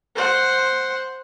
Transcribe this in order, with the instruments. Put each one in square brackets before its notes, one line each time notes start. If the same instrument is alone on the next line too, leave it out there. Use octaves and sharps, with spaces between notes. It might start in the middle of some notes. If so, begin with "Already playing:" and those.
[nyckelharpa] C5 F#5